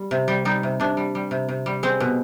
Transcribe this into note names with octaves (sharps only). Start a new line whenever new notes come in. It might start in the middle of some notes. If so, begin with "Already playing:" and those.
Already playing: G3
C3
G3
G3 D#4
C3
C3 D4
G3
G3
C3
C3
G3
G#3 C4
B2